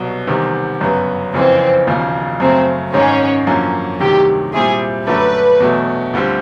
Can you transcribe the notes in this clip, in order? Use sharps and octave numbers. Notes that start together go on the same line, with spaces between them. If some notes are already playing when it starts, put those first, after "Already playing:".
Already playing: C2 B2 F#3
E2 C3 D#3 G3 C4
G1 F#2 C#3 F#3 B3
F#1 F2 C#3 E3 C4
E1 D#2 C#3 F3
F#2 C#3 F#3 A3 C4
G#1 G#2 D#3 G#3 C#4
F#2 D3 F3 A#3 C#4
D2 C3 D#3 F#3 G4
A#2 G3 C4 E4 G#4
F#2 D3 F#3 A3 D4 B4
E2 B2 F#3 A3
D2 D3 G3 C4 F4